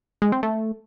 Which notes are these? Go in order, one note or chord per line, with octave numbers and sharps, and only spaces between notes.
G#3
C4
A3